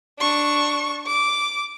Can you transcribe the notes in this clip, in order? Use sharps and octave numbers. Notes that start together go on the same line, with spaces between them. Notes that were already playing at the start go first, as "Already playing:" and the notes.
D4 C#6
D6